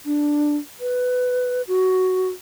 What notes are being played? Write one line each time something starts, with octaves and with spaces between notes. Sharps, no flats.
D4
B4
F#4